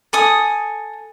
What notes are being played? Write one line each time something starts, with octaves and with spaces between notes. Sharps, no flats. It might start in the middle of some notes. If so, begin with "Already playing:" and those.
A4 G#5 D#6